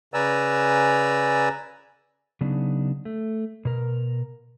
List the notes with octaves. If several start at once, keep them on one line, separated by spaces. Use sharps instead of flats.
C#3 B4 D5 G#5 A#5 E6
C#3 F#3 B3 D4 D#4
A3
B2 A#4